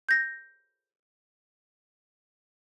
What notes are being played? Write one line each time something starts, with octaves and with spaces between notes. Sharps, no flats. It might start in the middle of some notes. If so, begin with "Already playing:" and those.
G6 A#6